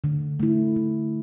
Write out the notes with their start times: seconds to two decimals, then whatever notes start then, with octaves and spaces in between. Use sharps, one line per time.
0.04 D3
0.40 A3 E4
0.76 D3